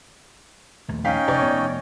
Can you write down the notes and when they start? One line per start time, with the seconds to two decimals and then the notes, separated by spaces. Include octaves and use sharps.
0.88 A#1 D#2 A3
1.05 C#4 D#4 F5 G5 B6
1.28 F1 C#5 D5 C#6
1.42 F1 D#2 B3